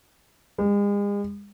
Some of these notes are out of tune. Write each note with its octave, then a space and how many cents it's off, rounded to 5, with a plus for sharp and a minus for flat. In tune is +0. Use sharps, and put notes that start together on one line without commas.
G#3 -40